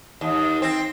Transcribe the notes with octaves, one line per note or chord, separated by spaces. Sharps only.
D#2
C4